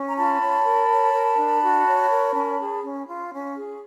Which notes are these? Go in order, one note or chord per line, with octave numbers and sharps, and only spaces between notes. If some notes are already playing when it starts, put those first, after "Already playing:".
Already playing: C#4
A#5
F4 A5 B5
C#5
A#4
C#5
A#4
D4
F#4
C#5
A#4
C#4
G#4
C#4
F4
C#4
G#4